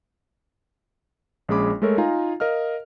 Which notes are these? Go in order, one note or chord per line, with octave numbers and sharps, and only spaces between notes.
A#1 G#3 C#4 G#4 B5 D6
G#3 A3 A4 A#4 C#5
D#4 F4 F5 G#5 A#5
A#4 D#5 F5 F6